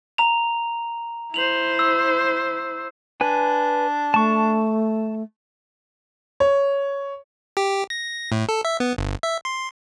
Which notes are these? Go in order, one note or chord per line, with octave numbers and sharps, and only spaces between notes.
A#5 F7
E4 C5 F7 F#7
E6
D4 B4 G#5
A3 A5 C#6
C#5
G4
A#6
A2
A4
E5
B3
G1
E5
C6